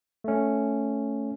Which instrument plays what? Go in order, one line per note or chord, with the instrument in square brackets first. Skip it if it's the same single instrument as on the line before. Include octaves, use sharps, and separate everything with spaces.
[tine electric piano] A3 C#4